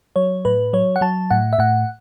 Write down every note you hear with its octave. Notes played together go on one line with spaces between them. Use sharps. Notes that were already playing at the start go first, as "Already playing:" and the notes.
F#3 C#5
A2 B4
F#3 C#5
F#5
F#3 A5
A2 F#5
E5
A2 F#5